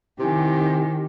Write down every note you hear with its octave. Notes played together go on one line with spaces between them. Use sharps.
C3 D#3 E4 G4 G#5